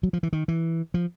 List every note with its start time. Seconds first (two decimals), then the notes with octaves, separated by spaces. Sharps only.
0.03 F#3
0.13 F3
0.23 E3
0.33 D#3
0.48 E3
0.94 F3